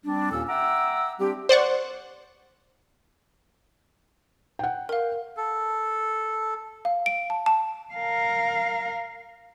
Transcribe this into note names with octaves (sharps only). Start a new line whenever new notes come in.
G3 C4 D4
D#2 A#2 A#3 C#4 A4 E6
E5 F#5 G5 A#5 D6 E6
G3 C4 D4 G4
C5 D5 F#5 C#6
F#5 G5
A#4 F5
A4
F5
D7
A5
A5
A#4 F5